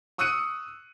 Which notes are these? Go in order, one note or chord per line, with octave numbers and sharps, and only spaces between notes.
C#6 D#6 E6 F#6 C#7 D#7